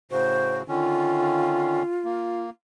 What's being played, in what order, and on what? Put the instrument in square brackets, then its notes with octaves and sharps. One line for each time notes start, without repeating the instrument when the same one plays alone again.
[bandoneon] A2 C#3 F#4 [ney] C5
[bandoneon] D3 D#3 C#4 [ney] F4
[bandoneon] A#3